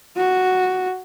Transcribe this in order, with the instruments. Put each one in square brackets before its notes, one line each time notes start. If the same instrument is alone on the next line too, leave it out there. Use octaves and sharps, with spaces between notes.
[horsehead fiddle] F#4